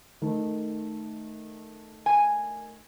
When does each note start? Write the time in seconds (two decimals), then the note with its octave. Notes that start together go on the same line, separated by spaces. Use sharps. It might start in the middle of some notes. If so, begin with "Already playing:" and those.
0.22 D#3 A3 D#4
2.06 G#5